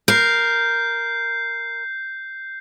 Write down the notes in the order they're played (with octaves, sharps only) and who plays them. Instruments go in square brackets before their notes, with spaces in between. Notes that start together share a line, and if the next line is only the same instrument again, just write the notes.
[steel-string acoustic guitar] A#4 [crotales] G6 C7